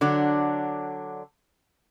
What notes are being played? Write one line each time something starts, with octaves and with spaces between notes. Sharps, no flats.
D3 F#3 D4